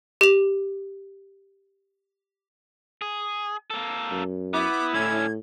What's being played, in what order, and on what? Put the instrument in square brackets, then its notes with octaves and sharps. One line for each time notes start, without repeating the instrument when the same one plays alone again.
[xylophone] G4 F7
[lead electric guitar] G#4
A#3 A4
[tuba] F#2
[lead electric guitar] B3 [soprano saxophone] E4 [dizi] D6
[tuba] A2 [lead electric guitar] D3 C#4 [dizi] G#6